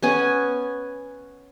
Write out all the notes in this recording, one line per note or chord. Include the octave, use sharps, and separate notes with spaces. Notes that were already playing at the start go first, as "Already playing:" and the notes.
B3 C#4 G#5